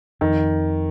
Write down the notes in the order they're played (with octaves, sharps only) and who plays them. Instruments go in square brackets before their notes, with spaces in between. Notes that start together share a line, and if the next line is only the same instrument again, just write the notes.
[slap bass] F2 [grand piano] D#3